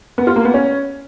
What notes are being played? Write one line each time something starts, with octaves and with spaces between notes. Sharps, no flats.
B3
F4
A#3
B3
C#4